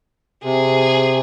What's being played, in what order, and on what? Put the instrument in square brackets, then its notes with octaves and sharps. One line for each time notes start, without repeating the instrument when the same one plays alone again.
[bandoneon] C3 [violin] G#4